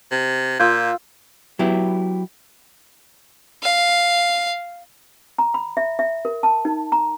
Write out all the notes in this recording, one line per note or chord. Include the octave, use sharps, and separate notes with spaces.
C3
A#2 F4 D#6 E6 G6 G#6
F#3 B3 E4 G4
F5
A#5
B5
E5
E5
A#4
A5
D#4
A#5